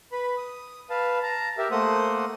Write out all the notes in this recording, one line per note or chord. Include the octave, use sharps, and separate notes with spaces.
B4 B5
D#6
B4 F5 A5
A5 A#5
G4 A#4 E5
A3 A#3 C5 F#5 D#6